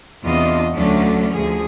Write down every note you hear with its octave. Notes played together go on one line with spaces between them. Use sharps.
E2 C3 D4 F4 D#5
D2 D3 F#3 A3 C#4 D4
D2 F3 G#4